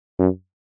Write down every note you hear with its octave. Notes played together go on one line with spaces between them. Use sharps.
F#2